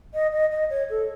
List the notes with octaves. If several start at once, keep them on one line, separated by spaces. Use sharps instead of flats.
D#5
D#5
D#5
C#5
A4